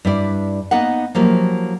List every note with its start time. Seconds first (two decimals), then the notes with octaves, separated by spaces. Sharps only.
0.05 G2 E4 D5
0.71 A#3 B3 D#4 D#5 F5 F#5
1.15 F3 F#3 A#3 E4 G4